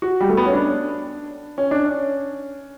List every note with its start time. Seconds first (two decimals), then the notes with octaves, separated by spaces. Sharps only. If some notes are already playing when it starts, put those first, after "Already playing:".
0.02 F#4
0.21 G3
0.29 A3
0.37 B3
0.46 C#4
0.54 D4
1.58 C#4
1.71 D4
1.85 C#4